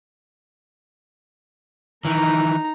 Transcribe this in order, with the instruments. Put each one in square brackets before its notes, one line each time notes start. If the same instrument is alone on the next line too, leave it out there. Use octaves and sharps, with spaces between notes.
[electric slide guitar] D#3 E3 [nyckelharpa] D#4 A#5